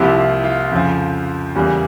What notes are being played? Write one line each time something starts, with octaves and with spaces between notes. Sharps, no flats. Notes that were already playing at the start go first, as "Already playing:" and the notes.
Already playing: C2 C3 F3 A#3 E4 G4
F4
F4
F2 C#3 F3
E2 C#3 G3 A#3